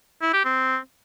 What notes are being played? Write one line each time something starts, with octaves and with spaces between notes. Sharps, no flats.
E4
G4
C4